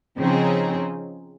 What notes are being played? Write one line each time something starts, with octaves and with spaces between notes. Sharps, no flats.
C#3 F3 C4 D#4 G#4